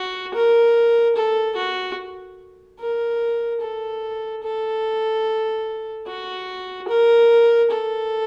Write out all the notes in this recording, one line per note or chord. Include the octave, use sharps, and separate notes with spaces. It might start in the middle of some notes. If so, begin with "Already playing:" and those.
Already playing: F#4
A#4
A4
F#4
A#4
A4
A4
F#4
A#4
A4